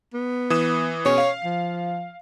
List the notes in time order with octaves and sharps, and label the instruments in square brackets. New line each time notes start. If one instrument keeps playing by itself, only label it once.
[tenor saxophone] B3
[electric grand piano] E3 D#6 E7
[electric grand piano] B2 C#4 G#4 [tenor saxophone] C#5
[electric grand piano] F5 C7
[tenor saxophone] F3